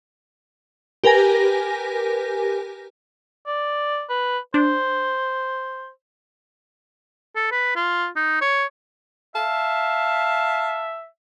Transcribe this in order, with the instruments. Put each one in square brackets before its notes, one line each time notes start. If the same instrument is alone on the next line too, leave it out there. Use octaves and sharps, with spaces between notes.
[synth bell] G4 A#4 B4 G#5 A#6
[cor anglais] D5
B4
[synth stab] D4 [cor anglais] C5
[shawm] A4
B4
F4
D#4
C#5
[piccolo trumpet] E5 [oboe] F5 [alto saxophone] A5